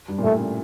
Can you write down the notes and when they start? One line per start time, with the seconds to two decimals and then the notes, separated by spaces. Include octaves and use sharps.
0.08 G2
0.18 A#2
0.24 A2 A3
0.39 C#3